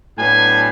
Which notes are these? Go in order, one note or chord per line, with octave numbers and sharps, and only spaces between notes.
A2 F#3 B3 D4 G#5